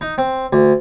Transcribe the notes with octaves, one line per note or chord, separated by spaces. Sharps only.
D#4
C4
D2